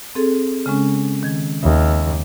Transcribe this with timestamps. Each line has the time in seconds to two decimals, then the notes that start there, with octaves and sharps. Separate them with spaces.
0.15 C4 G#4 A4
0.66 C#3 G#3 C#4
1.23 D#3 G#6
1.63 D#2 E5